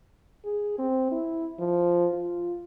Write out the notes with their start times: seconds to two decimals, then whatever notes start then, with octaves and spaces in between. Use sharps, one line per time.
0.45 G#4
0.78 C4
1.11 E4
1.59 F3
2.13 F4